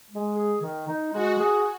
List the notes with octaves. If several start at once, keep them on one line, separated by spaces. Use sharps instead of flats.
G#3
G#4
D#3
D#4
G#3 F#4
G#4